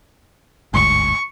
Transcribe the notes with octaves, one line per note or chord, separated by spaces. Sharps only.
G1 D2 G#2 C#6